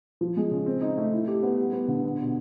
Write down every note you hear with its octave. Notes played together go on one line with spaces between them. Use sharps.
F3
G#3
C#3
C4
D#4
A3
E4
G4
B3
G3
B3
D3
B3
B2